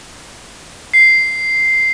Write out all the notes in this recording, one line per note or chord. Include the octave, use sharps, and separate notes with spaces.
C7